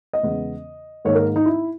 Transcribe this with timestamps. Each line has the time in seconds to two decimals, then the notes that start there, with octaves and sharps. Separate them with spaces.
0.13 D#5
0.23 E2 C#3 G#3 B3
1.05 G#2 D#3 A#3 C#5
1.15 A#4
1.36 D#4
1.46 E4